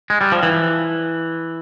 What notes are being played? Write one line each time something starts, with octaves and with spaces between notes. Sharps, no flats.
G#3
G3
F3
E3